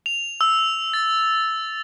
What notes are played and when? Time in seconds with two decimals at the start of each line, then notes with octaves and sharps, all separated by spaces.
0.06 F7
0.41 E6
0.94 A6